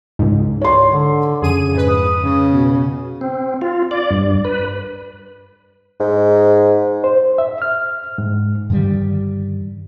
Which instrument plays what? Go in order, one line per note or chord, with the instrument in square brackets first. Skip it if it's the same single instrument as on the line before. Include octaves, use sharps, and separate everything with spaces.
[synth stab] C#2 G#2
[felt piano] C#5 C6
[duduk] D3
[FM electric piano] F2 [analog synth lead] C#3 [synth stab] G#4 D#7
[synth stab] G#2 B4
[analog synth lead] D#6
[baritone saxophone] C#3
[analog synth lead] B2
[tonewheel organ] C4
F4
D5
G2
B4
[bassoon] G#2
[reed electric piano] C5
E5
F6
G#2
[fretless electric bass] G2 D3 D#3 G3